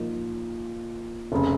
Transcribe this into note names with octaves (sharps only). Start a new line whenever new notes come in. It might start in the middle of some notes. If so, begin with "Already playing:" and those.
Already playing: A#2 F3 A#3 D#4
F1 C#3